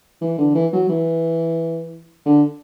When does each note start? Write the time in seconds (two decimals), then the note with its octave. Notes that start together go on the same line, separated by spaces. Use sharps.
0.22 E3
0.38 D3
0.55 E3
0.73 F#3
0.89 E3
2.26 D3